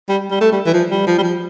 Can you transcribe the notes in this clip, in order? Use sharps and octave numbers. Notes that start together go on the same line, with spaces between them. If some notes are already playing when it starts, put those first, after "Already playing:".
G3
G3
A3
G3
E3
F3
G3
F3
G3
F3